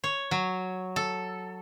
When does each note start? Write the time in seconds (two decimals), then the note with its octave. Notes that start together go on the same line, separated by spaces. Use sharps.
0.04 C#5
0.31 F#3
0.96 A4